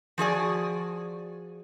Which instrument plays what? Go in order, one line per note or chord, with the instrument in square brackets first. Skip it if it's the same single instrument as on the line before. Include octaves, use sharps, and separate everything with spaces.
[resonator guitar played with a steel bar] F3 F#4 G#4 D5